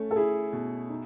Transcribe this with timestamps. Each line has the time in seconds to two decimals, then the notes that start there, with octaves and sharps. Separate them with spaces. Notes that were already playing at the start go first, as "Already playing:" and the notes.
Already playing: A3 C#4
0.11 A4
0.16 E4 G#4
0.53 B2
0.90 D#4